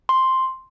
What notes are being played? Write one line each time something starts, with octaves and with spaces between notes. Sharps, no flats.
C6